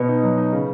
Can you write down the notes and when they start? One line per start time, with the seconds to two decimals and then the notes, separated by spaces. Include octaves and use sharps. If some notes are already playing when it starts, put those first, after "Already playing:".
Already playing: B2 B4
0.08 D#4
0.23 F#3
0.37 D#4
0.53 C#3